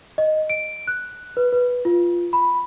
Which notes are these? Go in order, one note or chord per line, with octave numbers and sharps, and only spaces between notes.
D#5
D7
F#6
B4
B4
F4
B5